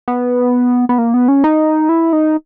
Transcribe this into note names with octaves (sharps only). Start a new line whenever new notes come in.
B3
B3
A#3
B3
C#4
D#4
E4
D#4